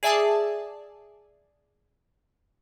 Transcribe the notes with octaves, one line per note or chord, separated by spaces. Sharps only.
G#4 D5 E5 G#5 A5 D#6